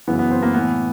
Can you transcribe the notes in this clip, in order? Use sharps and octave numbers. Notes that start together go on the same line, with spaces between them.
F#2 C#3 E3 B3
B3
C4
A#3
A2 E3 B3